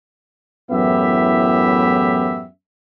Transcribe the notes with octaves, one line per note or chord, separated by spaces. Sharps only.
F#2 A2 E3 B3 G4 E5